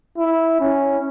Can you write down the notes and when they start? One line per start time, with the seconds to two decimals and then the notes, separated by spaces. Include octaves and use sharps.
0.18 E4
0.60 C#4